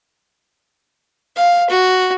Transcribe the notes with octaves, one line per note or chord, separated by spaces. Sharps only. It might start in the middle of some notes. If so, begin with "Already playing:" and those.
F5
F#4